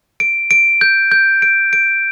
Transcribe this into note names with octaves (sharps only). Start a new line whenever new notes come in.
D7
D7
G6
G6
D7
D7